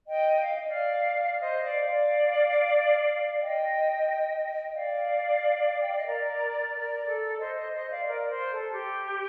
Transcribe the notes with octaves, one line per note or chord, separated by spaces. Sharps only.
D#5 G5
F5
D#5
D5 F5
C5 D#5
D5 F5
D5 F5
D#5 G5
D5 F5
G5
F5
D#5
A#4 D5
A#4 D5
A4
C5 D#5
C5 D#5
C5 D#5
D5 F5
A#4 D5
C5
A4
G4